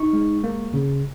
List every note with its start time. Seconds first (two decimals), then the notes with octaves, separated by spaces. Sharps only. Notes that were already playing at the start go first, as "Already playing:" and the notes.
Already playing: D#4 C#6
0.13 G#3
0.44 A#3
0.74 C#3